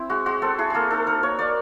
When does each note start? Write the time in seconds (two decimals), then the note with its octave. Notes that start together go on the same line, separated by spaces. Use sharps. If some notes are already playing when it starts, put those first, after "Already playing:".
Already playing: C4 E4
0.10 G#3 F#4
0.26 G#3 F#4
0.42 C4 A4
0.58 E4 G#4
0.70 A#3 G#4 A4
0.90 D#4 A4
1.06 D#4 A#4
1.23 A#3 C#5
1.39 A#3 D5